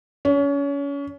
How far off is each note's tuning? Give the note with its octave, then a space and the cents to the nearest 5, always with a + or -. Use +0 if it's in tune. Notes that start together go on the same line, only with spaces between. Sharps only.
C#4 +30